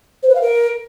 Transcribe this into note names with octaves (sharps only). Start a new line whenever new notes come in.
C5
B4
F5
A#4